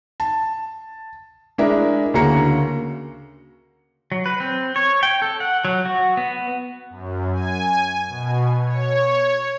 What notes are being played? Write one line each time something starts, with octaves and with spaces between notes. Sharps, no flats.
A5
G#3 D4 E4 A#4 E5
D2 C#3 A#3 F#4 A#5 C#7
F#3
B4
C4
C#5
G5
A4
F#5
F#3
F#4
B3
F#2
G#5
B2
C#5